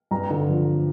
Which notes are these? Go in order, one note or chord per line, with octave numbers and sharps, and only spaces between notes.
G2 A#5
D3
F3